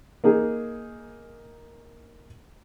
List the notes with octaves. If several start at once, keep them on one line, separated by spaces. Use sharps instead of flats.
A#3 D#4 G#4